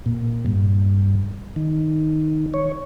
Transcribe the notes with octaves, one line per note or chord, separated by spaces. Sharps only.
A#2
G2
D#3
C#5